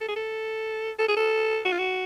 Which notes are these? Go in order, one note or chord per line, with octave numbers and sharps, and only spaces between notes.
A4
G#4
A4
A4
G#4
A4
F#4
F4
F#4